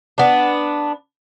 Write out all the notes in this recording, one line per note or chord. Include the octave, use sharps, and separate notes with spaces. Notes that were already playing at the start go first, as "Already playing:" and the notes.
B3 D4